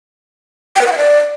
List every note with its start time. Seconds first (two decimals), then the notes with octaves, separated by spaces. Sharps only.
0.76 G5
0.81 B4
0.87 F#5
0.92 E5
0.97 D5